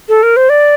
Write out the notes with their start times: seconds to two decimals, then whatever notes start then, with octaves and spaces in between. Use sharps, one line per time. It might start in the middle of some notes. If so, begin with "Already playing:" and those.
0.09 A4
0.23 A#4
0.37 C5
0.49 D5